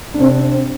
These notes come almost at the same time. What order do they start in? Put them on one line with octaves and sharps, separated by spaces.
D4 C3 C4